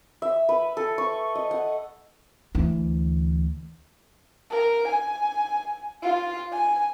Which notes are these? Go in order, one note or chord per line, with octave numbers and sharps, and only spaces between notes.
E5
B4
A4
C#6
D#5
F#5
D2 E3
A#4
G#5
F4
G#5